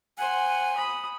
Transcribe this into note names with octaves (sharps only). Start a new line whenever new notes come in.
C5 F#5 G#5
B5 D#6